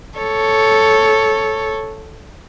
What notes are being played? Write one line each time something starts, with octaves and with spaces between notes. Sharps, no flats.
A4 C#5